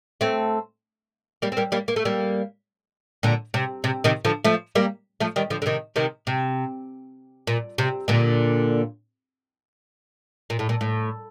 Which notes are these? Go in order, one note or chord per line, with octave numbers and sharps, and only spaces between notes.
A3 C4
G3 A#3
C4
G3 A#3
G3 A#3
A#3
A3
G3 A#3
A#2 D3
C3
C3
C3 D#3
D3 F3
F3 A3
G3 A#3
F3 A3
D#3 G3
D3 F3
D3
C3 D#3
C3 D#3
C3
A#2
C3
A#2 D3
A#2
A2
A#2
A2